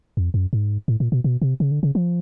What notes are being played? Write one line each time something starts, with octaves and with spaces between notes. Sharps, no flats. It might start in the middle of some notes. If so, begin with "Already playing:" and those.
F2
F#2
G#2
A2
A#2
B2
B2
C3
C#3
D3
C#3
F3